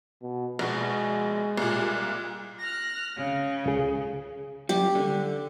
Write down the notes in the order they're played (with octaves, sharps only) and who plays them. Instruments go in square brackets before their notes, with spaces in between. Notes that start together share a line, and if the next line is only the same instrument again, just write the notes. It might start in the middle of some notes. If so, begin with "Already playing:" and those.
[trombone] B2
[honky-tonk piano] A#1 B2 [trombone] G#3
[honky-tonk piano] C2 A#2
[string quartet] F6 F#6 A#6
C#3
[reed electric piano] C#2 G#4
[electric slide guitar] F#2 G3 [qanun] G4
[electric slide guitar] D3